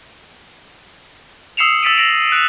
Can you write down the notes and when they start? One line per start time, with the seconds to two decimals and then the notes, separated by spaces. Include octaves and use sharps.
1.57 D#6 E6 C7 C#7 E7 F7
1.83 E6 A6 B6 D7 D#7
1.96 E6 A#6 D7 F#7
2.32 F#6 C#7 D7 F7